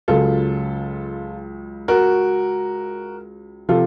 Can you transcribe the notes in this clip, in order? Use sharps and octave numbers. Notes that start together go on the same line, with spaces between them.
C#2 C#3 F#3 F4 A4
F#4 A#4
C3 F3 F4 A4